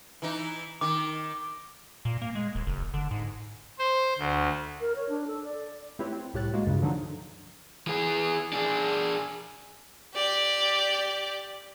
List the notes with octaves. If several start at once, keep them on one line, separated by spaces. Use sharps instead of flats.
E3 D#4
D#3 D6
A#2
A#3
G#3
D#1
F#1
D3
G#2
C5
D2
A#4
C#5
D4
A4
D5
A3 C4 E4 G4 B4 C#5
C4
C2 A2 G4 C#5 F#6 A6
G#3 A#3 F#4
C#2 G2 C#3
D3 D#3 F3 F#3 D4 D#4
E3 G#4
D4 G#4
G4 D5